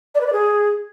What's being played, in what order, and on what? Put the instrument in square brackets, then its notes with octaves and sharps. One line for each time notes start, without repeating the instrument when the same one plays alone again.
[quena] D5
B4
D5
G#4